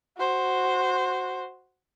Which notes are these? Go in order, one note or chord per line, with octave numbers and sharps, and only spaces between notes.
F#4 C5